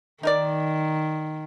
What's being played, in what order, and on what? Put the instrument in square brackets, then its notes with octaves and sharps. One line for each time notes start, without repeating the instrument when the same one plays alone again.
[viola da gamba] D#3 [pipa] D#4 A#4 D5